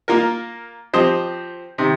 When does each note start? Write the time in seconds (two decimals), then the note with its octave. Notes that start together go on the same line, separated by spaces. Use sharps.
0.08 A#3 F4 A#4
0.94 F3 C4 G4 C5 D#5
1.78 C3 D#3